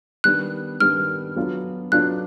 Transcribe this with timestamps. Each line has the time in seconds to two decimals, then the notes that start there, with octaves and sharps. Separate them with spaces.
0.24 D#3 G3 B3 D4 F#6
0.80 D#3 G3 B3 D4 F6
1.36 F#3 B3 D4 F4
1.92 F#3 B3 D4 F4 F#6